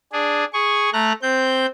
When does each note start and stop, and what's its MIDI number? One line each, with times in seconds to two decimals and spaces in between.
0.12 0.44 62
0.12 0.44 68
0.53 0.90 68
0.53 0.90 85
0.93 1.13 57
0.93 1.13 82
0.93 1.13 90
1.22 1.66 60
1.22 1.66 91